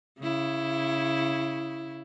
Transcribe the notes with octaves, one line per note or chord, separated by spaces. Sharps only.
C#3 E4